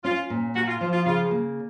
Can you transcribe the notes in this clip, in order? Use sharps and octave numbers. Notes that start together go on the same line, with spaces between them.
C#4 F4
A#2
A#3 F#4
F4
F3 F4
F4
C#3 F4
A#3